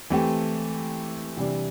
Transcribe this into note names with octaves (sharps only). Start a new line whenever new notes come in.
E3 A3 C4 G4
C3 E3 G3 D4